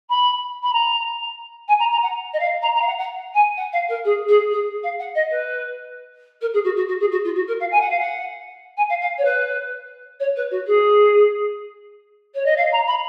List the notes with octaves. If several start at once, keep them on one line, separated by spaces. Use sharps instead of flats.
B5
B5
A#5
G#5
A#5
A#5
F#5
D#5
F5
A#5
A#5
F5
F#5
F#5
G#5
F#5
F5
A#4
G#4
G#4
G#4
F5
F#5
D#5
B4
A#4
G#4
F#4
F#4
F#4
G#4
F#4
F4
F#4
A#4
F5
G#5
F#5
F5
F#5
G#5
F5
F5
C#5
B4
C#5
B4
F#4
G#4
C#5
D#5
F5
A#5
B5